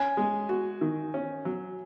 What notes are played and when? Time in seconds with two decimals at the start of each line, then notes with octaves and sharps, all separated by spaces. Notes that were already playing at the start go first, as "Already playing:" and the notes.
Already playing: C#4 G#5
0.17 G#3
0.49 F#4
0.81 D#3
1.14 C#4
1.45 F#3